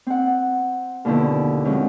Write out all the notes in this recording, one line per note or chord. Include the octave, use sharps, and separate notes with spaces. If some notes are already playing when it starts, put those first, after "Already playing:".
C4 F#5
D#2 B2 D3 F3 E4 B4
F3 F#3 G#3 C4 C#4